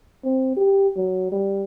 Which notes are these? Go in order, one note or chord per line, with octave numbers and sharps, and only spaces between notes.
C4
G4
F#3
G3